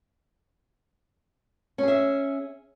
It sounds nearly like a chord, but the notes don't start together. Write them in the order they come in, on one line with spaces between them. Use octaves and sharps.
C#4 G#4 E5